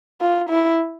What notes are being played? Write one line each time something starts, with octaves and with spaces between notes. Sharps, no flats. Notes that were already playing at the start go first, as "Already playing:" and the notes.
F4
E4